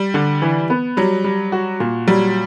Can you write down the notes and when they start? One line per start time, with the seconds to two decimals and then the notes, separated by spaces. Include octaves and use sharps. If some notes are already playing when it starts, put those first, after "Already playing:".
Already playing: G3
0.14 D3
0.42 E3
0.70 B3
0.97 F#3 G3
1.24 G3
1.52 F#4
1.80 A#2
2.07 F#3 G3